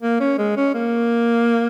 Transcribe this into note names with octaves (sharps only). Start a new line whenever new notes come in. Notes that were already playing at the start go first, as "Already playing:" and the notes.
A#3
C#4
G#3
C#4
A#3